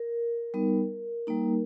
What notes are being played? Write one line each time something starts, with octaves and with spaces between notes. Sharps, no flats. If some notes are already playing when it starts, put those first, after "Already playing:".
Already playing: A#4
G3 B3 D#4
G3 A#3 D#4